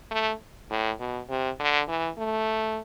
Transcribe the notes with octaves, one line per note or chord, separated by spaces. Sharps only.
A3
A2
B2
C3
D3
E3
A3